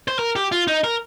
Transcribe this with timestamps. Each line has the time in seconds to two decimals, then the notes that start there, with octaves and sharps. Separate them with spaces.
0.08 C5
0.19 A#4
0.36 G4
0.52 F4
0.68 D#4
0.84 A#4